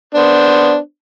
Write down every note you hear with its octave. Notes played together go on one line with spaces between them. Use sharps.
B3 D4 C5